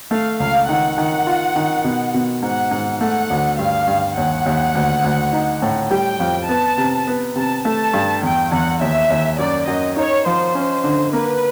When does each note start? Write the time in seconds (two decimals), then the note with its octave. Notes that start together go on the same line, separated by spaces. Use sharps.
0.11 A3 F5
0.40 C#2 F5
0.69 D#3 F#5
0.98 D#3
1.27 F4
1.56 D#3
1.84 B2
2.14 B2
2.42 G#2 F#5
2.71 G#2
3.01 A3 F#5
3.30 D2
3.59 G2 F5
3.87 G2
4.17 D#2 F#5
4.46 D#2
4.75 D2
5.04 D2
5.33 D#4
5.62 A2
5.91 G3 G5
6.20 F2
6.49 B3 A5
6.78 C3
7.07 B3
7.36 C3 A5
7.65 A3 A5
7.93 G2
8.23 E2 G5
8.52 E2 F#5
8.81 D#2 E5
9.10 D#2
9.39 F#2 D5
9.68 F#2 D#5
9.97 D#4 C#5
10.26 F3 C5
10.55 C#4
10.84 D3
11.13 A#3 B4